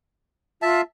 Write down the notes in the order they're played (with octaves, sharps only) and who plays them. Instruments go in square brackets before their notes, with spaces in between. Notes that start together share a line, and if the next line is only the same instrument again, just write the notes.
[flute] F4 [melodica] E5 A5